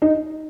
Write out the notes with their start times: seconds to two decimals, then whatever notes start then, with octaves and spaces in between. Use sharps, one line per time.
0.02 D#4